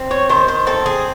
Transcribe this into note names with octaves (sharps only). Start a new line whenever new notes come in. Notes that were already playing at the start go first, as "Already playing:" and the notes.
Already playing: C4
C#5
D#3 C5
C5
C4 A4
G#4